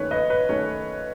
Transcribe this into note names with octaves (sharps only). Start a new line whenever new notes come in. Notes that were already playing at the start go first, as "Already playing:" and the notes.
Already playing: D#2 D#3 A3 C#4 B4 C#5
B4 D#5
B4
D#3 A3 C#4 C#5